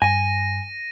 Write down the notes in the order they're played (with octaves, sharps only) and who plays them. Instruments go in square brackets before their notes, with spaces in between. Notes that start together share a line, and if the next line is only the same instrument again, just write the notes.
[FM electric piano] G2 [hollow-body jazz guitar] G#5 [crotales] A#6 D#7